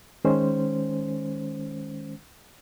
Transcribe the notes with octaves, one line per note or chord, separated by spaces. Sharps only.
D#3 G#3 C#4 C5